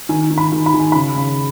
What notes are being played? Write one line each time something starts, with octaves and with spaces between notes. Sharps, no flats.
D#3 G#5
D#3
B5
D#3
B5
D#3
G#5
C#3 B5
C#3